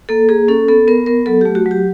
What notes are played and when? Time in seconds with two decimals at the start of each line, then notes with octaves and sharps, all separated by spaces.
0.09 A#3 A4
0.29 A#3 G#4
0.48 C#4 A4
0.68 B3 A4
0.88 B3 A#4
1.06 B3 A#4
1.26 F#3 A4
1.41 A3 G4
1.55 F#4
1.66 F#3
1.71 G4